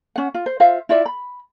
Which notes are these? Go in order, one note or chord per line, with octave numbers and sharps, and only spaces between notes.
C#4 F#5
F4
C5
F4 C5 E5 F5
E4 F4 D5 E5
B5